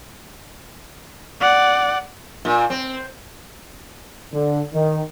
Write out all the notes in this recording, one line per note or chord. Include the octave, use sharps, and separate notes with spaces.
D5 F#5
A#2
C4
D3
D#3